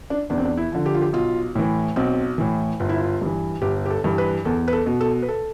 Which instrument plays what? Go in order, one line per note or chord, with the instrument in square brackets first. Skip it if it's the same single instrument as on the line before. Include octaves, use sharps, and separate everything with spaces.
[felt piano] D4
E2 D4
C4
D4
E4
D3 F3
G4
F4
G4
B1 F4
A2 E3
B1 C4
A2 E3
G1 F4
E4
F4
G2 E3
G1 G4
G4
A4
G2 E3
B4
E2 A4
B4
A4
B2
A4
B4
A4